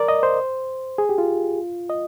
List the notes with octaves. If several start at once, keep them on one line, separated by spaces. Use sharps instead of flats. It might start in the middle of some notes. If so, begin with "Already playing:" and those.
Already playing: A#4 D5
D#5
C5
G#4
G4
F4
D#5